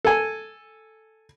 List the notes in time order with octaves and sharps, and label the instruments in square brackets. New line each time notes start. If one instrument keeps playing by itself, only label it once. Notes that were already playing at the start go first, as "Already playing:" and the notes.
[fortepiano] A4 G#5